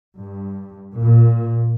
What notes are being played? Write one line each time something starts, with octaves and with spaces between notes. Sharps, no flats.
G2
A#2